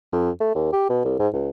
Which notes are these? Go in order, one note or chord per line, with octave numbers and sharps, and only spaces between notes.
F2
A3
D#2
G4
B2
C2
G#2
C#2